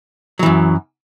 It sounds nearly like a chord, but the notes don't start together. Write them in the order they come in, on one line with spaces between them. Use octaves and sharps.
F#3 E3 F#2